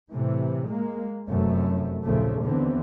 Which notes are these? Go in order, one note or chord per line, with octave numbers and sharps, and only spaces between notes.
A2 C3 E3
G#3 A#3
F1 F#2 A3
A#1 D#2 C#3 F3 A3
D#2 D3 E3 B3 C4